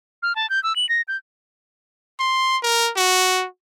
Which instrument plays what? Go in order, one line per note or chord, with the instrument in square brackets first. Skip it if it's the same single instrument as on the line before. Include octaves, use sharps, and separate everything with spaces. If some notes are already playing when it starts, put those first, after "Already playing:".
[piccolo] F6
A5
G6
E6
F#7
A#6
G6
[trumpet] C6
A#4
F#4